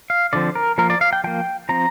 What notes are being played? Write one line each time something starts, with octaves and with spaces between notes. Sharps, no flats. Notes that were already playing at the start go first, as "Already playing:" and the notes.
F5
D3 F3 C4 D5
A#4
F3 A#3 A#4
D5
F5
G5
F3 A#3 G5
F3 C4 A#5